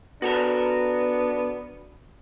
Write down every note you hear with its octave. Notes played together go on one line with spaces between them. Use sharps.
B3 D4 F#4 A4 A#4